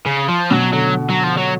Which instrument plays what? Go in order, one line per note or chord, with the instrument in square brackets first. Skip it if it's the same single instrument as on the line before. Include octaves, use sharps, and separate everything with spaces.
[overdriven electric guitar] C#3
F3
[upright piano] B2 [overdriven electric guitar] F#3
[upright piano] D3 [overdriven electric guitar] F#3
[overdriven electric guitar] F#3
F3
F#3